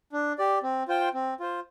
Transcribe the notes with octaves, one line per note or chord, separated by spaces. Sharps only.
D4
G4 D5
C4
F4 C5 G5
C4
F4 C5